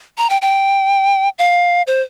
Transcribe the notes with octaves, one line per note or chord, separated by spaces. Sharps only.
A#5
G5
G5
F5
C5